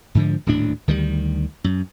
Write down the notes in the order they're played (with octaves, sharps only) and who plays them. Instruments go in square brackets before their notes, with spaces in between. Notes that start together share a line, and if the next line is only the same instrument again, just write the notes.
[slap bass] G#2 D3 F3
D#1 D2 A2 D4
D2 D#3 E3 G3
F#2